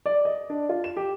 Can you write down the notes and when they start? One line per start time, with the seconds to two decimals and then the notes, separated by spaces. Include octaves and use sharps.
0.06 D5
0.25 D#5
0.50 D4
0.69 F4
0.84 E7
0.97 G4